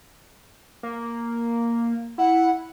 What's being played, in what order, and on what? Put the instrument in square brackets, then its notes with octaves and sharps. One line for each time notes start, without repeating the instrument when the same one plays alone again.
[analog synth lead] A#3
[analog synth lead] E4 [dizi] F#5